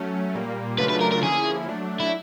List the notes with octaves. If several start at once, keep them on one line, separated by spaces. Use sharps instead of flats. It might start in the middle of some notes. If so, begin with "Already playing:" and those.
Already playing: F#3 A3 C#4
A#2 G3 A#3
C#3 F#3 A3 D4 F4 B4
B4
A#4
A#4
D3 F3 A#3 C#4 E4 G#4
F#3 A3 D4
E4